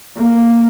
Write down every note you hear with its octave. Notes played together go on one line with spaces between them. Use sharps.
A#3